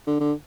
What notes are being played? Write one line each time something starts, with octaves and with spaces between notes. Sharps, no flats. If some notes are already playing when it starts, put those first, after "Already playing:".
D3
D3